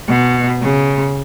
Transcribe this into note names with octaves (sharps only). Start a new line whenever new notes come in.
B2
C#3